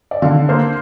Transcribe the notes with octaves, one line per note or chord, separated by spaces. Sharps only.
D5
D3 F5
A#3 C5